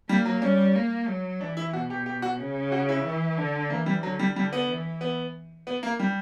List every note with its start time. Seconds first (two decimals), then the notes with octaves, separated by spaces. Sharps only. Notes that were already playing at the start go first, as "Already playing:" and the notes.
0.09 G3 A#3
0.25 F#3
0.42 G3 C#4
0.75 A#3
1.08 F#3
1.40 E3 D4
1.57 E4
1.73 B2 F#4
1.90 G4
2.06 G4
2.22 F#4
2.39 C#3
2.72 F#4
2.89 E4
3.04 E3
3.38 D3
3.70 E3 A#3
3.86 G3
4.03 D3 F#3
4.19 G3
4.35 D3 G3
4.53 B3
4.69 E3
5.01 B3
5.67 B3
5.83 A#3
5.99 G3